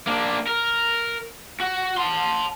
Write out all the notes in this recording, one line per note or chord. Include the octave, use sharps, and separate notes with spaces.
A#3 D4
A#4
F#4
A5 C6